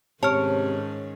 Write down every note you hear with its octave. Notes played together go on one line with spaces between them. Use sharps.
G#2 C3 D#3 C#4 C#5 A5 F6